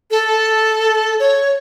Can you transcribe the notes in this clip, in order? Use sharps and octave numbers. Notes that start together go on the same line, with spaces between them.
A4
C#5